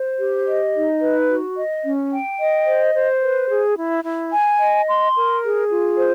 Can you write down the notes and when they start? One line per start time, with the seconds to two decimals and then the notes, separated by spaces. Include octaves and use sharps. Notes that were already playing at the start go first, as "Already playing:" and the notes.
Already playing: C5
0.19 G4
0.46 D#5
0.74 D#4
1.01 B4
1.29 F#4
1.57 D#5
1.85 C#4
2.12 G5
2.39 D#5
2.67 C5
2.95 C5
3.22 B4
3.50 G#4
3.77 E4
4.04 E4
4.31 G#5
4.59 D#5
4.87 C6
5.15 A#4
5.42 G#4
5.69 F4
5.96 C5